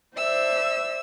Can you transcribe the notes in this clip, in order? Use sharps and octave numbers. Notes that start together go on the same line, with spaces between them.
C5 D5 E5 E6